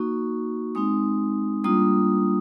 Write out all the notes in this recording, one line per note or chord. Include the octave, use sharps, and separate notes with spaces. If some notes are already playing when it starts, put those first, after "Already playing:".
Already playing: A#3 D#4 F#4 C#6
G#3 C4 D#4 D#6
G3 A#3 D4 F4 D#6